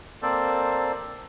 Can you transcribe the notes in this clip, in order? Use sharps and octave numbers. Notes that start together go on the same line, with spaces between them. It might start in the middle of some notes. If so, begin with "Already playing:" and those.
A#3 C4 A4 C5 D5